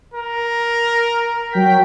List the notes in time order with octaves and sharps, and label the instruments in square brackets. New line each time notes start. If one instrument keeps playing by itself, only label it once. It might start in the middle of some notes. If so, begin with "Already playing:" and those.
[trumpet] A#4
[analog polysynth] F#3 G5 B6